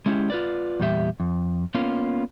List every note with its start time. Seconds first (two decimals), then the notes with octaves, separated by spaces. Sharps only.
0.06 G#3 C#4 E4 G4
0.30 F4 B4 D5
0.80 E2 A#2 G3 G4 E5
1.20 F2
1.75 A#3 B3 C#4 F4